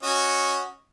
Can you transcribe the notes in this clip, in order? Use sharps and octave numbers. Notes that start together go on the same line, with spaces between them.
C#4 F#4 D#5